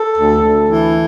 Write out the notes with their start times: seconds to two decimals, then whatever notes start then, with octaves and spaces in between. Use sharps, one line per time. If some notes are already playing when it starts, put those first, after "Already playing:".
Already playing: A4
0.16 D2
0.42 D2
0.68 E3